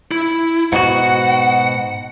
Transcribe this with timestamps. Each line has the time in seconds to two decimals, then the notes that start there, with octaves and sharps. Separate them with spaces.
0.11 E4
0.73 G#2 B2 F#4 F#5